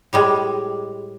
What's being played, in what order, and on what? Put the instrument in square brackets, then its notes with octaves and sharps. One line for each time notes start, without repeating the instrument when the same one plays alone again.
[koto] A2 G3 G#3